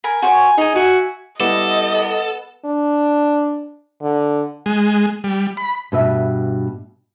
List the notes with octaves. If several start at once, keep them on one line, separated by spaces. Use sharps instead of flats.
A#4 G#5 B5
F#4 C5 C#5 G#5
D#4 G#4 G#5
F#4 E5 G#5
G3 B3 E4 A4 D#5 D6
D4
D3
G#3
G3
B5
G2 B2 E5